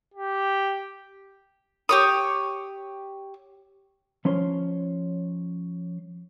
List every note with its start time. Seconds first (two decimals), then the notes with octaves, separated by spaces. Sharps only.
0.14 G4
1.89 G4 C#5 D#6
4.25 F3 C#4 C#5 C6